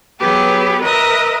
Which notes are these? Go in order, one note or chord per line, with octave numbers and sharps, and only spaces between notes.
F#3 B3 G4 G#4 B4
A#4 B4 D#5 E5 A#5 D#6